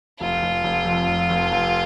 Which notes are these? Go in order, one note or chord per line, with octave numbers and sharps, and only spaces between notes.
F1 F4
F1
F1
F2
F1
F1
F1